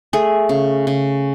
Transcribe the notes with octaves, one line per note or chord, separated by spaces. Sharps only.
A3 G#4
C#3
C#3